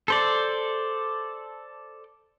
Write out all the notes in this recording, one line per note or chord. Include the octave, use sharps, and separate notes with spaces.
A4 C5 D5